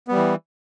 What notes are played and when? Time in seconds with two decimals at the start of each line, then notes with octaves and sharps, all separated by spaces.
0.08 B3
0.12 G3
0.16 E3